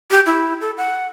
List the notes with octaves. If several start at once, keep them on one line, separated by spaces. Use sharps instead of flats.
G4
E4
A4
F#5